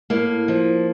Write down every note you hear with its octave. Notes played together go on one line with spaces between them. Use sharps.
A2 A#3
F3